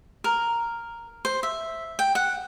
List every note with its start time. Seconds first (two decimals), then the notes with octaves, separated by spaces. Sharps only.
0.24 A#4
1.25 C5
1.43 E5
1.99 G5
2.15 F#5